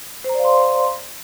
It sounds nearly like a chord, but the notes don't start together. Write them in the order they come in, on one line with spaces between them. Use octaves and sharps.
C5 A#5 D5 F5 C6